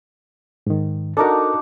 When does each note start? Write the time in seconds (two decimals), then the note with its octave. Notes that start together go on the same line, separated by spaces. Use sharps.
0.67 G#2 D#3
1.17 D4 D#4 F#4 A4 A#4